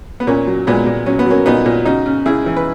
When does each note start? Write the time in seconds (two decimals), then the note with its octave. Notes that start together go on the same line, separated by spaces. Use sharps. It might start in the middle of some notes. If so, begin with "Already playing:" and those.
0.20 B3
0.27 A#2 A#3 C#4
0.47 F#3
0.67 A#2 G#3 B3
0.87 A#2
1.06 F#3 C#4
1.19 B3
1.26 F#3 A#3 C#4
1.46 A#2 B3 D#4
1.66 A#2
1.85 C#3 D#4 F#4
2.06 C#3
2.26 C#3 E4 G#4
2.46 E3
2.56 B4